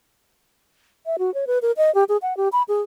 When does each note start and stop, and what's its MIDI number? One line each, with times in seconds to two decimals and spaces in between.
1.06 1.16 76
1.19 1.33 66
1.34 1.45 73
1.47 1.59 71
1.62 1.72 70
1.77 1.93 75
1.95 2.04 67
2.09 2.17 68
2.22 2.36 78
2.37 2.49 67
2.52 2.63 83
2.68 2.82 68